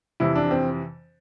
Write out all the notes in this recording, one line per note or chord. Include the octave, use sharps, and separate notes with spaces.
F2 C3 E3 E4
D4
C4